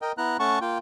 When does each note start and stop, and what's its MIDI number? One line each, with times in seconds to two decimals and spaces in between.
0.02 0.12 70
0.02 0.12 75
0.02 0.12 79
0.18 0.37 59
0.18 0.37 64
0.18 0.37 82
0.18 0.37 90
0.40 0.59 57
0.40 0.59 61
0.40 0.59 78
0.40 0.59 81
0.40 0.59 85
0.61 0.78 58
0.61 0.78 65
0.61 0.78 79